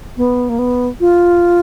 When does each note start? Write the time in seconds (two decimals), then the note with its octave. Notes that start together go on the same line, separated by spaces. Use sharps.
0.17 B3
0.49 A#3
0.59 B3
1.00 F4